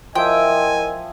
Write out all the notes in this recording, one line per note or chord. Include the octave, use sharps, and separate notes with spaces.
F3 E4 A#4 D#5 E5 G5 G#5